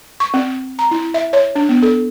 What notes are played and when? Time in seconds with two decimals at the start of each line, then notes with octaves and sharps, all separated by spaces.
0.20 C#6
0.34 C4
0.79 A#5
0.91 E4
1.14 E5
1.33 C#5
1.55 D4
1.69 B3
1.82 A4